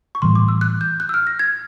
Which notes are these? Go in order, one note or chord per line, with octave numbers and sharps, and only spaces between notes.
C#6
A2 E3 G3 C6
D6
E6
F#6
G6
F#6
E6
F6
A#6
G#6